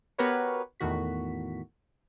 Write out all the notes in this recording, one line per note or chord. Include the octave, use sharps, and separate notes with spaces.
B3 F#4 G4 A#4 B4 C#5
E2 A2 D#3 F#4 B6